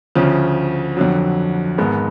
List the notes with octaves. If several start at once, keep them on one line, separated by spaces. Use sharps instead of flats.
D2 C#3 F3
F2 D3 F#3
G#1 G#2 G#3 B3